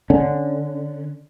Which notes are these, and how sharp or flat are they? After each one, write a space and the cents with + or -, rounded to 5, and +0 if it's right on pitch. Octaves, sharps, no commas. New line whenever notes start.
D3 +0 C#4 +0